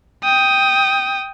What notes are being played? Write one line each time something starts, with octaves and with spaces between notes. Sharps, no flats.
G5 D#6